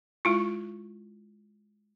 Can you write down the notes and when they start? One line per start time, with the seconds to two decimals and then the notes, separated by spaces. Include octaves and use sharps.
0.25 G#3 E4 F4